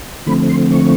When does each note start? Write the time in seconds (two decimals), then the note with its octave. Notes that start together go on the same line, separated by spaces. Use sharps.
0.26 D3 F3 A3 C4 B5
0.49 C6
0.72 C#6